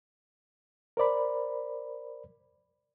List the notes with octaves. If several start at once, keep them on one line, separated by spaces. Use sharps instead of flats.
A#4 C5 D5 B5